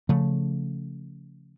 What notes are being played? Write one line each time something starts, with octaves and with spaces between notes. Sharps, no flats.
C#3 F3 A3